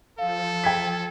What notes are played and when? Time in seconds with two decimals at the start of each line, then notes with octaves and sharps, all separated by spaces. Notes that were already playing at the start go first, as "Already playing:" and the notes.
0.18 F3 A4 F5
0.64 G5 G#6 B6